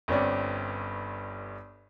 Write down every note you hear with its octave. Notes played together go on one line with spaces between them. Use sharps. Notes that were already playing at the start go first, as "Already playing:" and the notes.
G1 G2 C4 C#4 C#5 D5